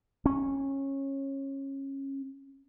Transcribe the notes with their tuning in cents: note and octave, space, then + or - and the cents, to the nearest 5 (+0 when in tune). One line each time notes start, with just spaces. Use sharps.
C#4 -20